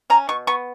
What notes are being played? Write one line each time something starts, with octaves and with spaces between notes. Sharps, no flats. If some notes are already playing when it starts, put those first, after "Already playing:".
C#4 A#5
B2 C#6
B3 C#6